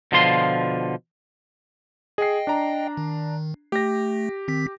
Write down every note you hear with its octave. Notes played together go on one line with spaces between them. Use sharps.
B2 D3 F3 F4 C6
G#4 D#5 G5 C7
D4 A#5
D#3
A3 G4 A#6
D#3 C4 B6